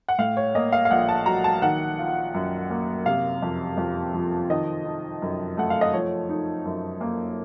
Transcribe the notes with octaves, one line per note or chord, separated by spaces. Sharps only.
F#5
A2 F5
C#5
A#3 D#5
F5
F5
A#1 F#5
A5
F#3 A#5
A5
D#3 F#5
F4
F#2
A#3
C3 F5
F2
F2
F3
D#3 D#5
D#4
F#2
A3 F#5
F5
D#5
F3 C#5
D#4
F#2
A#3